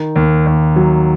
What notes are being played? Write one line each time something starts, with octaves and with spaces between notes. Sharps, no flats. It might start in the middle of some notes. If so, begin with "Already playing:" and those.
Already playing: D#3
D#2
D#2
F#3